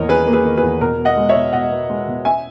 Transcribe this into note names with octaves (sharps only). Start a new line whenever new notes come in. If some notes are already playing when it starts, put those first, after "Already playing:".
Already playing: E2 D#3 A#3 A#4 C#5 D#5
C#4 G#4 B4
A#3
G#4 B4
D#3
G#4 B4
E2
B2 A#4
B3
D#5 F#5
G#3
C#5 E5
B2
B2 D#5 F#5
B3
G#3
B2
C#4 E5 G#5